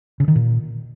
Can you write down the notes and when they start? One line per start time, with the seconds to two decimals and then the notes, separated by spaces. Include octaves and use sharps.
0.20 C#3
0.28 D#3
0.36 A#2